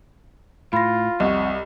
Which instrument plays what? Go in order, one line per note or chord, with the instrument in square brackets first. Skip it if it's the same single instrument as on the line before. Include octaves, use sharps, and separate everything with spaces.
[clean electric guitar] A2 [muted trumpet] F4 [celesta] B5 A#6
[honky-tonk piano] C2 [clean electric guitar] F2 F#4 [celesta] D#5